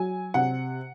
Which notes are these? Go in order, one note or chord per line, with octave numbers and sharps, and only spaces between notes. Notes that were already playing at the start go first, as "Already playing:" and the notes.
Already playing: F#3 G#5
C3 F#5